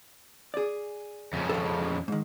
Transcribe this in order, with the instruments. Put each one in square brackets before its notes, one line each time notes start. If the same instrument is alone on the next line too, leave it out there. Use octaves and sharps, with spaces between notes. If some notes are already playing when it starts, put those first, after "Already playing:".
[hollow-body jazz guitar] G#4 D5
[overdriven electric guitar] F2 C#3
[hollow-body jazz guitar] A4 F5
G#2 D#3